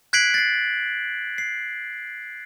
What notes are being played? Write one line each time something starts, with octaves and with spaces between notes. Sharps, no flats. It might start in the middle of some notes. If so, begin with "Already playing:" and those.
F#6 G#6 B6 C7 D7 F#7
A6 C7
C7